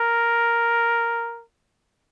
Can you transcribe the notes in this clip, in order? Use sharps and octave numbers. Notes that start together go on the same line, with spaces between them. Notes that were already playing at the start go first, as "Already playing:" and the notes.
Already playing: A#4